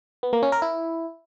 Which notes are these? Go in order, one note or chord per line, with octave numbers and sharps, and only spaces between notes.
B3
A#3
C#4
A#4
E4